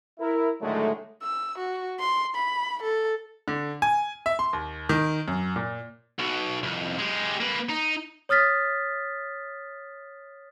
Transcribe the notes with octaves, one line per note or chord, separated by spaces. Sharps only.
E4 A#4
A2 D3 D#3 F#3 G#3 A3
E6
F#4
C6
B5
A4
D3
G#5
E5
C6
D#2
D#3
F#2
A#2
B1 B2
C2 F2
G#3 G4
A#3 B4
D#4
C#5 D#6 F6 A6 B6